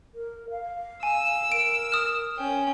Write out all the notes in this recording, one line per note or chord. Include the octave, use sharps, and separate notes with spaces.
A#4
F5
G#5 E6
A#4 D7
D#6 F6
C#4 G5